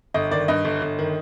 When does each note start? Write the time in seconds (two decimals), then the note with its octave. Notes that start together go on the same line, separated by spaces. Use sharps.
0.14 G1 D#5
0.31 D#3 D5
0.48 G2 D#5
0.65 G1
0.82 G1
0.99 D#3